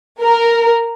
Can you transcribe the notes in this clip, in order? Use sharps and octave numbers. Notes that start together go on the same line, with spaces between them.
A#4